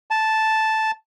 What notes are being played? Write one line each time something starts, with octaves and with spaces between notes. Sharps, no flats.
A5